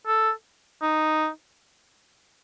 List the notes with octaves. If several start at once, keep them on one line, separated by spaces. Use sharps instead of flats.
A4
D#4